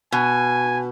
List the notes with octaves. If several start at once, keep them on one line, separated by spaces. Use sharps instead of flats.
B2 G#5